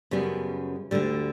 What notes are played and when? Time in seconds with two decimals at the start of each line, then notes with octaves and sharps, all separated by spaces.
0.11 F#2 C#3 G3 B3
0.91 D2 D3 G3